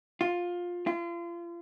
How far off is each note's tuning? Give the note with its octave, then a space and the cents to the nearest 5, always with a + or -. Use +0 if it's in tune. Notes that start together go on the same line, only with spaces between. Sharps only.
F4 +15
F4 -35